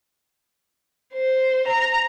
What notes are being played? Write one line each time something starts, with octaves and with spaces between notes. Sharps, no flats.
C5
A#5